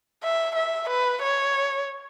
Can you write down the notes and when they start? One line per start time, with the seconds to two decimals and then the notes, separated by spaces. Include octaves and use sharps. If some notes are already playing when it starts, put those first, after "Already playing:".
0.23 E5
0.55 E5
0.89 B4
1.22 C#5